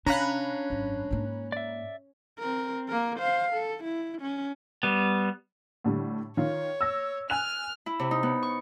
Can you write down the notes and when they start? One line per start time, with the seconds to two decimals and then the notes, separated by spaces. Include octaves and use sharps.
0.06 C3 C#4 D4 F5 A#5 B5 F#6
0.70 G#1 F#2
1.11 G#2 A#3
1.52 D5 E5
2.39 C4 A#4
2.89 A#3 A#4
3.19 C5 F5
3.53 A4
3.84 E4
4.22 C#4
4.83 G3 B3
5.84 A2 D3 G3
6.37 D#3 F4 C#5
6.81 E6 A#6
7.30 G#5 F6 F#6 F7
7.86 E4
7.99 C3
8.11 D#4
8.23 B3
8.43 C#6